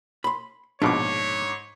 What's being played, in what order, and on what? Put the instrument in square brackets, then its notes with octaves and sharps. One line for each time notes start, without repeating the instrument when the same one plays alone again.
[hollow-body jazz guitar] B5 C6
[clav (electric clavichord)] A#1 B2 [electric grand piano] G#2 D6 [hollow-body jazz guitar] D4 [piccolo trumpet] C#5